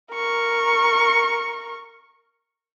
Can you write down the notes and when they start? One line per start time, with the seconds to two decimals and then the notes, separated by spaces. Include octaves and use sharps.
0.14 A#4 C#6